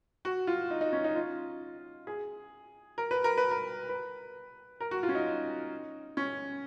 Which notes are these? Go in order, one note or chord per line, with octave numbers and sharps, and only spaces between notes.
F#4
F4
D#4
D#4
C#4
D#4
F4
G#4
A#4
B4
A#4
B4
A#4
B4
A#4
F#4
F4
C#4
D#4
C#4